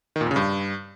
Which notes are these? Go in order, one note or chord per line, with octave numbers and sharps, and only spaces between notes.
D#3
A#2
F2
C#3
G2